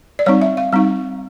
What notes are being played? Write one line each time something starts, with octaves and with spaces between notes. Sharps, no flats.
D5
G3 C4 D#4 C#5
E5
F5
G3 C4 D#4